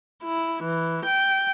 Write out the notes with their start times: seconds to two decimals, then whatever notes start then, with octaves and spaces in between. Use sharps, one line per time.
0.22 E4
0.64 E3
1.05 G5